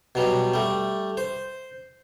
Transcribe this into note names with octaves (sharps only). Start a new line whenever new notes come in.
B2 F#3 G3
G3 A3
C5